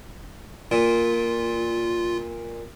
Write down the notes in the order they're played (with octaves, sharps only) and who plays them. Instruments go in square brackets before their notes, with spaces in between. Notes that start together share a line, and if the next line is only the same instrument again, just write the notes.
[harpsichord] A#2 [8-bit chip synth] F4